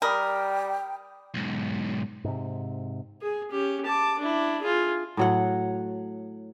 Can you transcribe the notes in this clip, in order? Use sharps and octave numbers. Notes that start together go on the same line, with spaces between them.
G3 A#4 G5 B5 D#6
B1 G#2
G#2 C3
G#4
C#4 G4
A5 D6
D4 E4
F4 G#4
A2 F#3 F#5